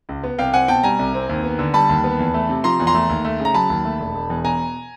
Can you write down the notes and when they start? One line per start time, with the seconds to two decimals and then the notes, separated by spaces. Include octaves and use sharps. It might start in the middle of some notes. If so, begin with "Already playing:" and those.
0.09 C#2
0.24 B3
0.39 C2 F5 G5
0.53 C4 F#5 G#5
0.68 B2 G5 A5
0.83 G3 G#5 A#5
0.99 C2
1.14 C4
1.29 D#2
1.44 B3
1.59 D3
1.74 G3 A5 B5
1.89 D#2
2.04 B3
2.19 E2
2.34 A3
2.49 C3
2.64 F3 A#5 C6
2.80 E2
2.87 A#5 C6
2.94 A3
3.09 D#2
3.25 A3
3.40 C#3
3.45 A#5
3.54 F#3 A5 B5
3.70 D#2
3.85 A3
3.99 E1
4.15 E1
4.30 E2
4.45 B2 G#5 A#5